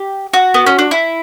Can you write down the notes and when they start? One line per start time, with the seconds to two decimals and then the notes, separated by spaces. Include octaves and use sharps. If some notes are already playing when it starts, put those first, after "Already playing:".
Already playing: G4
0.33 F#4
0.54 B3
0.66 C#4
0.79 D4
0.91 E4